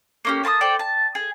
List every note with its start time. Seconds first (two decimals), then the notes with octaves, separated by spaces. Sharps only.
0.25 A#3 C#4 G4
0.44 A#3 A5 C6 D#6
0.61 A4 C5 D5 G5
0.79 A5
1.15 G#4